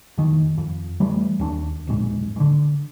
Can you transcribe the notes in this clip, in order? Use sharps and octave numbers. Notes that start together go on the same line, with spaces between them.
F2 D#3
F2
E3 G3 A3
D#2 C#4 D4
E1 A#1 G#2
G#2 D3